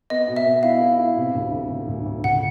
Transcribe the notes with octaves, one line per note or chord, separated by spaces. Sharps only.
B3 D#5
B2
E5
B3
E4 F5
E4
E4
C3
D2
D2
D2
D2
D2
C#2 F#5